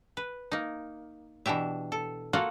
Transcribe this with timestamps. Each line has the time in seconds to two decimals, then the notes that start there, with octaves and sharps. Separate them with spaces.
0.17 B4
0.52 A#3 D#4
1.46 B2 E3 D4 G4 E5
1.92 A4
2.33 A#3 F4 F#4 A4 F#5